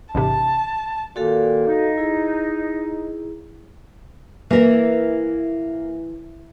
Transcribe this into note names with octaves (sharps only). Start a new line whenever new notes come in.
A1 G#2 C3 A5
A#2 D#3 A#3 F#4 A4 F5
D#4
E4 G#4
E3 A#3 A#4 E5